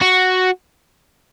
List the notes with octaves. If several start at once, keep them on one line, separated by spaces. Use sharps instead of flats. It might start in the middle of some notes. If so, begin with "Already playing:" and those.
F#4